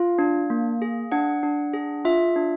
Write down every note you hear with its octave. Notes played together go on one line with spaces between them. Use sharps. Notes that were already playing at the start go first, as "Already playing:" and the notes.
Already playing: F4 F5
D4
A#3
G#4
D4 F#5
D4
G#4
F4 E5
D4